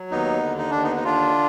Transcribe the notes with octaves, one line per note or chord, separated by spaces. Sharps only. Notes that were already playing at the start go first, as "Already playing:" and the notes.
Already playing: F#3
D#2 B3 D#4
D3
D#4
D#2 D4
B3 D#4
D#4
D3 D4 F4